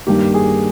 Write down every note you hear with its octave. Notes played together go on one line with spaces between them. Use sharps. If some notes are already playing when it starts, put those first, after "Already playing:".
G2 D#3 A#3 G4
G#4